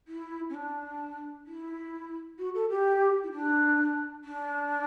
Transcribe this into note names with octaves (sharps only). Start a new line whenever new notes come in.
E4
C#4
D4
E4
F#4
A4
G4
E4
D4
D4